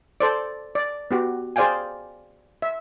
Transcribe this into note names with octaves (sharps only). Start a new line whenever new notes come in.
A4 C5 D5
D5
B3 F#4 G4
G#4 C5 D5 F5 G5 G#5
E5